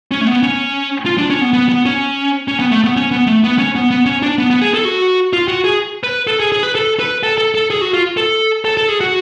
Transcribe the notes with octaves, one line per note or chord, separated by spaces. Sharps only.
C#4
A3
B3
C#4
F4
D4
C#4
B3
B3
B3
C#4
C#4
B3
A3
B3
C#4
B3
A3
B3
C#4
B3
B3
C#4
D4
B3
B3
G#4
A4
F#4
F4
F#4
G#4
B4
A4
G#4
G#4
B4
A4
B4
A4
A4
A4
G#4
F#4
F4
A4
A4
A4
G#4
F#4